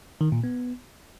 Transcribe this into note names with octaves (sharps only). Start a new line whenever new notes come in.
D#3
A#2
B3